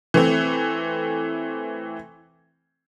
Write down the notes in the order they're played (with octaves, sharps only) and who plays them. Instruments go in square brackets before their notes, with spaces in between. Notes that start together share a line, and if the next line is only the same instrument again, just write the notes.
[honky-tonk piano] E3 A3 C4